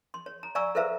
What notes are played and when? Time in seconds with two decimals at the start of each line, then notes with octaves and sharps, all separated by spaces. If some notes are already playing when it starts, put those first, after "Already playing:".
0.14 C6
0.26 C#5
0.43 A#5
0.55 D5 F5 G#5 A#5 C#6 E6
0.75 A4 B4 C5 E5 F5 A#5